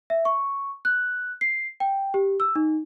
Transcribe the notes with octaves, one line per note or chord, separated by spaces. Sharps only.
E5
C#6
F#6
C7
G5
G4
E6
D#4